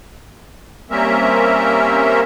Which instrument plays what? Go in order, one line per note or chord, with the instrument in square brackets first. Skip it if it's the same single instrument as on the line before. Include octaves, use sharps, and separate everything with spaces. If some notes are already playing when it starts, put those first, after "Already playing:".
[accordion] G3 A#3 C4 C#4 A#4 E5